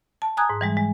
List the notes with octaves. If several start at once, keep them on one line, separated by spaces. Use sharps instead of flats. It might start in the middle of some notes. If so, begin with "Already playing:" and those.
A5
G#5 A#5 D#6 F#6 G#6
G#2
E3 G3 G#3
G#3